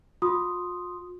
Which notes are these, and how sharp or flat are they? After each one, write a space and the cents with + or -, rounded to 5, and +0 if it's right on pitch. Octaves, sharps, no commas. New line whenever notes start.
F4 +40 C6 +0 D#6 +0